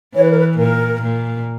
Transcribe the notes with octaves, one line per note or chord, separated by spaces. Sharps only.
E3 C#5
B4
A#4
B4
A#2 A#4
A#2